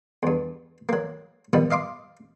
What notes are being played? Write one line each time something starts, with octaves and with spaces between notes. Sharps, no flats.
E2 G2
F#3 A#3
B2 D#3 F3 G3 B3
D#5 F5 C6 D6